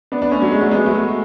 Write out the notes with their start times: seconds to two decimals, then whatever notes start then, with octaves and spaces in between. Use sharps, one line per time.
0.12 B3 D4
0.22 B3 D4
0.31 A3 C#4
0.41 F#3
0.51 G#3
0.61 F#3 A3
0.71 G#3 B3
0.86 F#3 A3